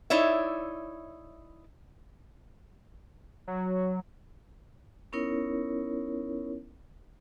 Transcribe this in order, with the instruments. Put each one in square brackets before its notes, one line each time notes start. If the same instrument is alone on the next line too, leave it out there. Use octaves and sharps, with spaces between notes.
[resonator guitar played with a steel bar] D#4 E4 C#5 D5 E5
[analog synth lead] F#3
[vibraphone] B3 C#4 D#4 E4 A#4 C#5